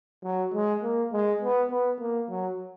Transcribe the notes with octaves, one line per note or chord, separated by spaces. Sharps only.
F#3
G#3
A#3
G#3
B3
B3
A#3
F#3